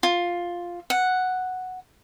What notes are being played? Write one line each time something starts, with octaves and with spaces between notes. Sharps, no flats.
F4
F#5